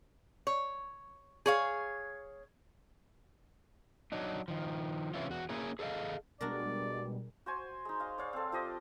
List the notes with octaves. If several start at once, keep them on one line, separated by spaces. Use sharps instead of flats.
C#5
G#4 C#5 F5
F#3 D4 D#4
D#3 F3
C3 E3 C#4 E4 F4
E2 F#4
A#3 C#4 E4 G#4
G#4 A4 C#5 D#5 F5
B2 G3 G#3 D4 F#4 A#4 D5
F#4 C5 G#5
G#3 D#4
D#5 F5
C#5 D5 F5
C4 A4
F3 G4 D#5 D6